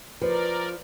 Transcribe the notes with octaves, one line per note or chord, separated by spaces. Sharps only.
F3 A#4 B4 D5